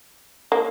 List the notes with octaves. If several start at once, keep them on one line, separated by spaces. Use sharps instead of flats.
A#3